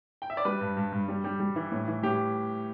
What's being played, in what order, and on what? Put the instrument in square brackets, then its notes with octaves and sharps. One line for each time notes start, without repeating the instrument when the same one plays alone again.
[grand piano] G5
E5
D5
G3 B4
G2
G2
G2
G3
G3
G3
E3
A2
E3
A2 G4